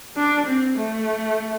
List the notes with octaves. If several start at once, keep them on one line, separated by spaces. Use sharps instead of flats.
D4
C4
A3